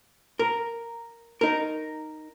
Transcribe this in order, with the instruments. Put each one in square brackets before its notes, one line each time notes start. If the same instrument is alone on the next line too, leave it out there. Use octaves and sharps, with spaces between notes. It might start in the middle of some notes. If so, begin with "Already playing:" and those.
[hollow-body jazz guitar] A#4
D#4 A#4